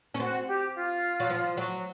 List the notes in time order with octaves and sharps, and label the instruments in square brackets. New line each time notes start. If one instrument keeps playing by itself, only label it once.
[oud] C#4
[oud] C4 [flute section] F#4
[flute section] G4
F4
[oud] F#3
F3
F#3